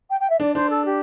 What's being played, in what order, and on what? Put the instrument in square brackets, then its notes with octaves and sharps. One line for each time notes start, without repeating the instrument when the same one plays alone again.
[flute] G5
G5
E5
[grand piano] D4 [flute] D5
[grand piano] D4 [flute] C5
[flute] A4
G4